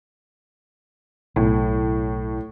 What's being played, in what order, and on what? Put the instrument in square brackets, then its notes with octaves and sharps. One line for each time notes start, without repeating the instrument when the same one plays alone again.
[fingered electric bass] B1 [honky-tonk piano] A2